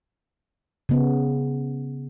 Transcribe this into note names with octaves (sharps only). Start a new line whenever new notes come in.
C#3 B3